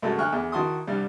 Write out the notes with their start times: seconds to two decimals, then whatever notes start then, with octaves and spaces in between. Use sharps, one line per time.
0.02 C2 F#2 G#3 A3 F#4 A5
0.18 D2 C#6 F6 F#6
0.32 E2
0.52 D#3 E4 F#4 A5 C6 D#6
0.87 C2 G2 G3